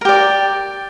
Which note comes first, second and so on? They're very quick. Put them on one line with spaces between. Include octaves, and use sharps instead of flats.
A#4 G4 D5